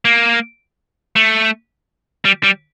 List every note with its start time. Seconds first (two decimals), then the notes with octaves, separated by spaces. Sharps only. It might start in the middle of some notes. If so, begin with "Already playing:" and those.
0.05 A#3
1.16 A3
2.25 G3
2.44 G3